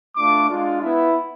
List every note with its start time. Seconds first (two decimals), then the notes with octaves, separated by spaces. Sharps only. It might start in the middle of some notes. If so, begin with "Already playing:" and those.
0.17 A3 D4 F4 D6
0.49 G#3 D4 F4
0.82 B3 E4